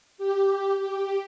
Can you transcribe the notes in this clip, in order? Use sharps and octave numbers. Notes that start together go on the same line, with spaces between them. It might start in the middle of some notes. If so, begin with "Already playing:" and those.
G4
G4